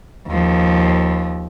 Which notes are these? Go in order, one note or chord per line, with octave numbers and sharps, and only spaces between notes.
D#2 F3